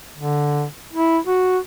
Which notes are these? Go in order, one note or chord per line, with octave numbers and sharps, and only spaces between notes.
D3
E4
F#4